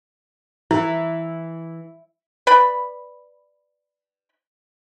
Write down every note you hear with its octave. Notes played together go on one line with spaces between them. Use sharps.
E3 E4
B4 D5 B5